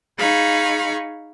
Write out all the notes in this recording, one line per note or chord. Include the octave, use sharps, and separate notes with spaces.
D#4 G#4 F5 B5 C#6